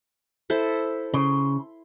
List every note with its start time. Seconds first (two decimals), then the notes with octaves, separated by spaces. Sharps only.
0.50 E4 A4 C5
1.14 C#3 C6